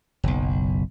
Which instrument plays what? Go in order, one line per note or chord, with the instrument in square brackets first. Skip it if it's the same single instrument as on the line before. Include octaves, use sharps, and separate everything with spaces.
[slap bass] F#1 B1